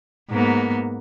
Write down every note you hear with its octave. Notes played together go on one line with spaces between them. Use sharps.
G#2 A#3 B3